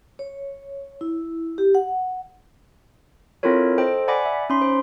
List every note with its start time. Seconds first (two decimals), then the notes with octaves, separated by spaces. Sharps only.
0.19 C#5
1.01 E4
1.58 G4
1.75 F#5
3.43 C4 E4 F4 A4 A#4 C#5
3.78 A4 C5 D#5 G5
4.08 D5 F#5 G#5 B5 D6 A#6
4.25 E5
4.50 C#4 D#4 B5 C6
4.62 C5